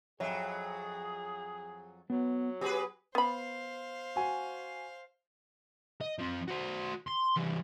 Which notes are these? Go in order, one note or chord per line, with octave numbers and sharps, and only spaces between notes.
F2 F#3 G#4 C#5 E5
F#3 B3
B3 G4 G#4 B4
B3 C5 F5 B5
F#4 G#5
D#5
F3 C4
F#4 C5
C6
E3 G3